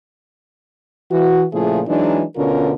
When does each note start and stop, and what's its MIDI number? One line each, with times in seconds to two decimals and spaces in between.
1.11 1.45 52
1.11 1.45 66
1.53 1.81 46
1.53 1.81 49
1.53 1.81 53
1.53 1.81 57
1.53 1.81 64
1.53 1.81 68
1.87 2.23 52
1.87 2.23 54
1.87 2.23 56
1.87 2.23 62
1.87 2.23 63
2.37 2.73 38
2.37 2.73 47
2.37 2.73 50
2.37 2.73 61
2.37 2.73 65
2.37 2.73 70